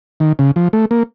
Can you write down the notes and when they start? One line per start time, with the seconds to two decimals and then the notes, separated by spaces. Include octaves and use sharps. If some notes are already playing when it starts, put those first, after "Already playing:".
0.20 D#3
0.39 C#3
0.56 F3
0.73 A3
0.91 A#3